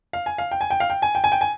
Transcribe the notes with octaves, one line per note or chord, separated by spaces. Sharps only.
F5
G#5
F5
G5
G#5
G5
F5
G5
G#5
G5
G#5
G5
G#5